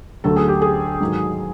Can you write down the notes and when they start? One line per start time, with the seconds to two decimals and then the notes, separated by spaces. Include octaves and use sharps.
0.24 D2 D3 F#3 A3 A4
0.36 G#4
0.48 G4
0.62 G#4
1.00 G#2 D#3 F#3